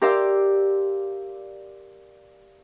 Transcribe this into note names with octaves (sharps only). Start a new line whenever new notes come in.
G4 A#4 D5 F5 C6 E6